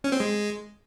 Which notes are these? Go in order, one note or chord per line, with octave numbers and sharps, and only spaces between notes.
C#4
C4
G#3